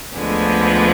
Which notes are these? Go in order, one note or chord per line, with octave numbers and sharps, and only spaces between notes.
D2 D3 F3 G#3 B3